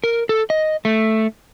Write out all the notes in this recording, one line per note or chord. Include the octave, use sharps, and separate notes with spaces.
A#4
A4
D#5
A3